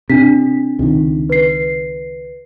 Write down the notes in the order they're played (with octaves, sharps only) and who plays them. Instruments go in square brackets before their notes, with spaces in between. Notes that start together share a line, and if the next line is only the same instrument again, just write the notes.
[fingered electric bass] C3 [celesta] D4 B6
[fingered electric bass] C#2 C3 D#3
[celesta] B4 C7